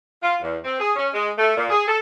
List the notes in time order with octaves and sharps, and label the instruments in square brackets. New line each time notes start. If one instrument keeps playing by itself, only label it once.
[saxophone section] F4
E2
C4
G#4
C#4
G#3
A3
A#2
G#4
A4